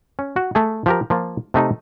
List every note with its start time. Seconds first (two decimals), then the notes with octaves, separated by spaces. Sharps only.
0.19 C#4
0.36 F#4
0.55 A3 G#4
0.86 F3 G4 A#4
1.10 F3 A#3 F4
1.54 C3 A3 D#4